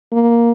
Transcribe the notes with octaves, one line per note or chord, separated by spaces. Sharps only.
A#3